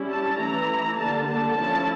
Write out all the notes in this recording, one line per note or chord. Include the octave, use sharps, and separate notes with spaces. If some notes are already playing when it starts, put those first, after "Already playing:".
Already playing: G3 C#4 E4
A5
E3 A3 E4 A#5
D3 G3 A#3 D4 A5
A5
F3 A3 C#4 E4 A5